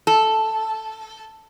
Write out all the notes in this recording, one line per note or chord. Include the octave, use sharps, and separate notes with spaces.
A4